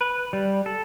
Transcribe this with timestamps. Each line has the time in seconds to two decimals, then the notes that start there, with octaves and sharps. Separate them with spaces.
0.01 B4
0.33 G3
0.66 A4